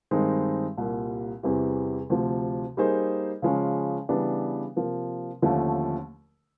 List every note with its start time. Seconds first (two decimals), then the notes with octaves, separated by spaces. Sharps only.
0.11 G2 D#3 G#3 C4 D#4
0.78 C2 A#2 G3 A#3
1.43 E2 C3 E3 G3 C4
2.10 D2 C3 F3
2.77 G3 A#3 D#4 G#4 C5
3.42 C#3 F3 G#3 C#4
4.09 C#3 E3 G3 B3 D4
4.76 C3 F3 A#3
5.42 D#2 D3 F3 A3 C#4